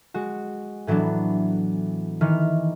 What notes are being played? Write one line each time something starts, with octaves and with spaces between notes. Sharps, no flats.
G#3 F#4
A2 E3 F#3 B3 D4
D#3 E3 F6